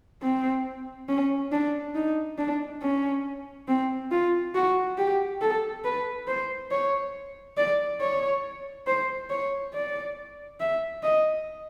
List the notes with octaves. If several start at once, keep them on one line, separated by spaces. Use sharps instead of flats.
C4
C#4
D4
D#4
D4
C#4
C4
F4
F#4
G4
A4
B4
C5
C#5
D5
C#5
C5
C#5
D5
E5
D#5